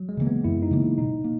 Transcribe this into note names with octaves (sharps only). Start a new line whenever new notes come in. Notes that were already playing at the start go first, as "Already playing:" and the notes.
Already playing: F#3
G#3
C#3 E3 A#3
B3
F#2 E4
D#4
C#3 E3 A#3
B2 D#4
A#3